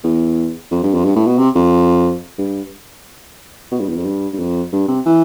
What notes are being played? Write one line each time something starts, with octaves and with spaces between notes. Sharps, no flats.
E2
F2
G2
F2
G2
A2
B2
C3
F2
G2
B2
G2
E2
F2
G2
G2
F2
G2
C3
E3